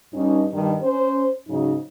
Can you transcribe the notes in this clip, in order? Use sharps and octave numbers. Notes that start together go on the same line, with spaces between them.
G2 C#4 D#4
G2 D#3 G3 D4
C#4 C5
G#2 C#3 F#3 D#4